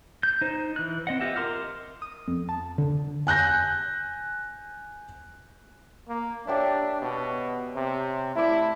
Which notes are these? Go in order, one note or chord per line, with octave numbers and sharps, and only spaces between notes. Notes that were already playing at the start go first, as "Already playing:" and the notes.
G6
D#4 C5
E3 F#6
C4 D#5 F#5
F4 G4 D#5 E5
A#4 C6 D6 F6
D#6
F2
A5
D3
G#5 F#6 G6 A#6
A#3
D4 G4 C#5 E5
B2
C3
A3 E4 D5